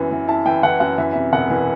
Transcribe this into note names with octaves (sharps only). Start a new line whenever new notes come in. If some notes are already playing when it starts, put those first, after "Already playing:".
Already playing: F#2 E3 B3
E3
E4 A5
E3 G5
E3 F#5
F#2 F#5
E3 E5
C3 E5
E1 F#5
E3